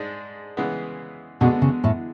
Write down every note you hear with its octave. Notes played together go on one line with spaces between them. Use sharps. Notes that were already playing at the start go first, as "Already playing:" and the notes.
Already playing: G#2 G#3 D4
C#3 E3 G#3 B3
B2 D3 G#3 B3 F#4
C#3
A2